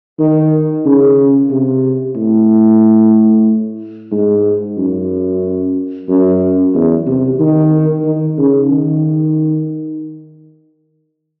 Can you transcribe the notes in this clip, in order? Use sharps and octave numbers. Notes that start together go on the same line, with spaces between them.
D#3
C#3
C3
A2
G#2
F#2
F#2
E2
C3
D#3
D#3
C#3
D#3